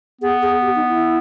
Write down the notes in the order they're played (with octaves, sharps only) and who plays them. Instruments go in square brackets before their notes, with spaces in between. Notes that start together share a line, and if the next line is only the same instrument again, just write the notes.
[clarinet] B3 [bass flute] G#4
[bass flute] G#4
G4
D#4
E4